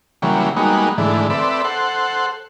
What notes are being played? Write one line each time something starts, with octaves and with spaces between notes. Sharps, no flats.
C#3 E3 F#3 G3 A#3
G3 G#3 A#3 B3 D#4 F#4
G#2 D3 E3 A3
C4 A4 B4 D5 E5
A4 C5 F#5